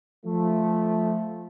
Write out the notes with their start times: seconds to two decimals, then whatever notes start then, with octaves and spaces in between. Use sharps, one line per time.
0.24 F3 A3